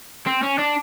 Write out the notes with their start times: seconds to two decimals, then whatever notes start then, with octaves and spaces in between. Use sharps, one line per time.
0.27 C4
0.43 C#4
0.59 D4